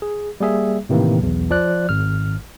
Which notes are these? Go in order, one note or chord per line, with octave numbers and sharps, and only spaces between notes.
G#4
G3 A#3 G#4 E5
A2 C3 D#3 E3 A#3
B1 E2
F3 D5 F#6
G#1 F6